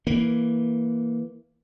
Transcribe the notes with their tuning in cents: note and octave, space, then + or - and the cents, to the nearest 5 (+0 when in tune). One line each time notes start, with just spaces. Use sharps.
E3 +0 A#3 +0